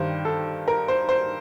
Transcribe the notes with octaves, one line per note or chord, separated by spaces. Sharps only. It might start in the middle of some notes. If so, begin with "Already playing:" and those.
Already playing: G2 D#3 G3 C5
A4
A#4
C5
C5